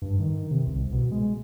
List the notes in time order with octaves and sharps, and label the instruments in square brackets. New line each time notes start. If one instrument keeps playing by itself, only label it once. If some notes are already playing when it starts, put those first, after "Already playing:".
[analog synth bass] G2
D#3
C3
C2
B2
G#3